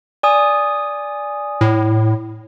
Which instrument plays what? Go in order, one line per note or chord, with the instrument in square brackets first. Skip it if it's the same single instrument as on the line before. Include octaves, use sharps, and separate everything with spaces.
[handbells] D5 G#5 D#6
[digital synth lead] A2